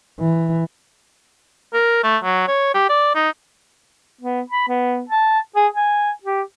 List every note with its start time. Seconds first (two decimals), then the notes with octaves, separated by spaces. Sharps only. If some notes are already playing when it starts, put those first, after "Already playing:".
0.20 E3
1.73 A#4
2.04 A3
2.24 F#3
2.48 C#5
2.75 G4
2.89 D5
3.15 D#4
4.22 B3
4.50 B5
4.69 B3
5.10 A5
5.56 G#4
5.74 G#5
6.24 G4